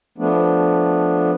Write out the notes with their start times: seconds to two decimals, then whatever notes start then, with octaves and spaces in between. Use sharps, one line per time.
0.18 F3 A3 B3 D4